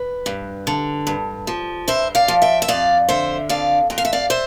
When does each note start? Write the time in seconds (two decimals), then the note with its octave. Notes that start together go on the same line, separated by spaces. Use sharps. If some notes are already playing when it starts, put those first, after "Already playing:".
Already playing: B4
0.26 G2
0.67 D3
1.07 G2
1.47 F3
1.88 G2 C5 E5
2.15 D5 F5
2.28 F3
2.42 E5 G5
2.62 E5
2.68 F2 D5 F5
3.09 D3 C5 E5
3.49 F2 D5 F5
3.90 F2 G5
3.98 F5
4.05 E5
4.13 D5 F5
4.30 C5 E5